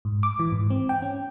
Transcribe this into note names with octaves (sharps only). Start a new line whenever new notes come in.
G#2
D6
E3
G#2
C4
G5
C#4